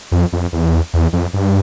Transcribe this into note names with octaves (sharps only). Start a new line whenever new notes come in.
F2
F2
E2
E2
F2
G2